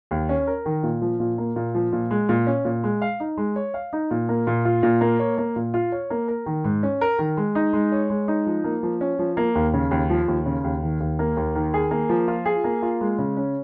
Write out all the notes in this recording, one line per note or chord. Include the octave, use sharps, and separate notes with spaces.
D#2
C#4
A#4
D#3
A#2
F3
A#2
A#3
A#2
F3
A#2
G#3
A#2
C#4
A#2
G#3
F5
D#4
G#3
C#5
F5
D#4
A#2
A#3
A#2
F4
A#2
A#3
C#5
A#3
A#2
F4
C#5
A#3
A#4
D#3
G#2
C#4
A#4
D#3
G#3
D#4
G#3
C#5
G#3
D#4
F3
A#3
F3
C#4
F3
A#3
D#2
C#3
D#2
F3
D#2
C#3
D#2
D#3
D#2
A#3
D#2
D#3
G#4
A#3
F3
F4
G#4
A#3
F4
G#3
C#3
C#4